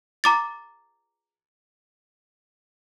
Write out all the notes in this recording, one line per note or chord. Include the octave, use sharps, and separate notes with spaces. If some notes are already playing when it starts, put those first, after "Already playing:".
A#5 D6 A6